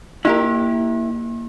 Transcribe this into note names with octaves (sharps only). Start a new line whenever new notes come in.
A#3 E4 G4 A#4